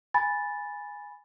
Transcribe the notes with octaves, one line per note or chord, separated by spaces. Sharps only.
G#5 B5 A6